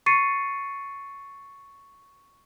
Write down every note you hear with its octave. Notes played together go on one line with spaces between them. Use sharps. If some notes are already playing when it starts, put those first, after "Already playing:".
C#6 A6 C7 C#7 D#7